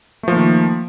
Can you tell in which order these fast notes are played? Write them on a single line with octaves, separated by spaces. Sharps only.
A3 F3 A#3 D#3